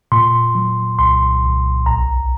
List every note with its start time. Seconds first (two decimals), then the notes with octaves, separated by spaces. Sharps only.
0.12 A#2 C6
0.55 F#3
0.99 C2 C6
1.43 C2
1.86 A#1 A#5